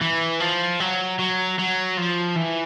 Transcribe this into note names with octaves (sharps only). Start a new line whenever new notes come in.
E3
F3
F#3
F#3
F#3
F3
E3